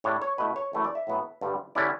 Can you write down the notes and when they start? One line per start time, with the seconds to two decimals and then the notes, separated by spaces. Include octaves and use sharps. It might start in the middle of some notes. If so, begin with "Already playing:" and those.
0.04 A2 G3 D4 C#5
0.22 C#5
0.38 B2 A3 E4 B4
0.56 C#5
0.73 F#2 E3 A3 E4
0.84 D5
0.95 E5
1.07 A2 F#3 B3
1.41 G2 D3 G3
1.75 D3 G3 C#4 E4 D5